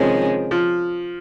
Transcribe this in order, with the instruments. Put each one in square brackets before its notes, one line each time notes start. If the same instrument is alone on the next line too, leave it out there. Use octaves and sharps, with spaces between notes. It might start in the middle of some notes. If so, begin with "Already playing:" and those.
Already playing: [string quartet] C3 F3 G#3 C#4 [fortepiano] D#3
[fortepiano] F3